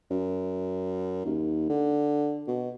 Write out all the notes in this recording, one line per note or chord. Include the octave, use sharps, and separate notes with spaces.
F#2
D#2
D3
B2